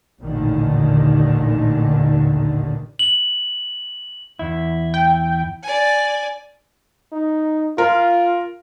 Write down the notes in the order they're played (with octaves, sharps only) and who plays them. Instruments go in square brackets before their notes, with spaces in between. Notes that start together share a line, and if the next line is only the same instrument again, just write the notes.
[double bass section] A1 D#2 A#2 D3 D#3
[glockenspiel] F#7
[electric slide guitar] E2 E4
[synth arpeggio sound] G5
[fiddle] D5 G#5
[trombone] D#4
[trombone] F4 [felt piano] A#4